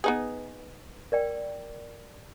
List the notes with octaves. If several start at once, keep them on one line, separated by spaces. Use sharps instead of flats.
B3 D#4 G#4 B4
A#4 D5 G5